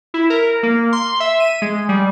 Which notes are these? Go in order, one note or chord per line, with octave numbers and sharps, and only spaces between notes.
E4
A#4
A#3
C6
E5
D#7
G#3
G3